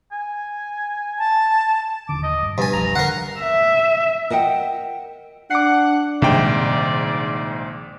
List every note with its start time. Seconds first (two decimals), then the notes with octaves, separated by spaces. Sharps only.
0.12 G#5
1.19 A5
2.09 D#1 D3 D6
2.23 D#5
2.42 G2
2.58 G2 B2 D4 G#5 A5
2.73 F1 B1 F3 A#5
2.95 D3 A#4 F5 F#5
3.40 E5
4.30 A#4 D#5 F#5 G5
5.51 D4 F#5 D6 C7
6.22 A#1 G#2 C3 D#3 G3 D5 G5